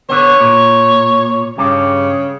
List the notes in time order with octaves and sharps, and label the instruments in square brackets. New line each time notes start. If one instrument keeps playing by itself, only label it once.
[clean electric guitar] D3 B3 [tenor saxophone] C#5
[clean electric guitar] A#2
[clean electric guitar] G2 G4 [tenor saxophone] C#3